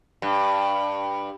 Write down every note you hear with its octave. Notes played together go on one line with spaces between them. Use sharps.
G2